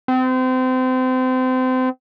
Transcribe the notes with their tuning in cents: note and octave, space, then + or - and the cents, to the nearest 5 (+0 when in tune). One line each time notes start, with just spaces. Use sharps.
C4 -30